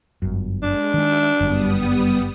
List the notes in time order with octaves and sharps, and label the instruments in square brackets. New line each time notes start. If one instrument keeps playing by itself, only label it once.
[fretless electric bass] G1 F#2
[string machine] G#3 [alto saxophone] D4
[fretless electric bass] D#3 G#3 [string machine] E5
[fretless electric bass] G1 F#2 D3 [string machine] G3 B3 D#6